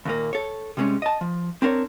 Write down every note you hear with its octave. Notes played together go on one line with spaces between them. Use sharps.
D#2 A#2 A#3
A4 C#5
C3 G3 G#3 A#3 C#4
D#5 A5
F3
C4 D4 A#4 C#5